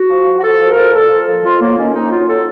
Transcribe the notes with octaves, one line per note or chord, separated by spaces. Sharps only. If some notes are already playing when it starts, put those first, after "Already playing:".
Already playing: F#4
F3
F3
F#4
F3 A4
F3
A#4
F3
A#2 A4
F3
F3
F2 F4
F#3 A#3
D#3 C#4
F2 D#4
F#3 F4
F#3 A4